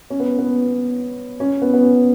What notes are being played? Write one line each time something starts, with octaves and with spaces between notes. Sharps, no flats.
C#4
B3
B3
C#4
B3
B3
C#4